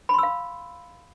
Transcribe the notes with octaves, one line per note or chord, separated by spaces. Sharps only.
F5 B5 C6 E6